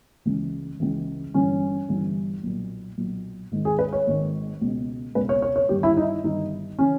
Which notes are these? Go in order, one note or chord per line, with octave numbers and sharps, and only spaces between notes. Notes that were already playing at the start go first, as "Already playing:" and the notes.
C#2 C#3 E3
C#2 C#3 E3
G1 G2 E3 C#4
G1 G2 E3
B1 A#2
B1 A#2
G#1 G#2 D#3
G#4
B4
C#5
G#1 G#2 D#3
C#2 B2
C#2 B2 B4
C#5
C#5
C#5
G1 G2 D#3 G4
E4
D#4
G1 G2 D#3 D#4
C#3 E3 C#4